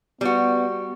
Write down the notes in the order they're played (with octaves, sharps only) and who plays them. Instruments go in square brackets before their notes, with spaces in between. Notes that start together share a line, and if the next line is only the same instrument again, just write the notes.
[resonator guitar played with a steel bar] G3 F#4 [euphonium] B3